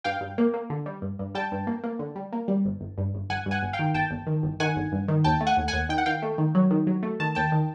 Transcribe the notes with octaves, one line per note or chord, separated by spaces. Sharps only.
G2 F5 G5
G2
A#3
A#3
D3
G3
G2
G2
G3 G5 A5
G2
A#3
A#3
D3
G3
A#3
G3
G1
G1
G2
G1
G1 F#5 G#5
G2
F#5 G#5
G1
F5 G5
D#3
G1 G5 A5
G1
D#3
G1
D#3 F#5 G#5
G1
G2
D#3
D#2 G5 A5
A3
F#5 G#5
D#2
D#2 F#5 G#5
D#3 G5
F#5
D#3 F5 G5
A3
D#3
F#3
D#3
F#3
A3
D#3 A5
D#2 G5 A5
D#3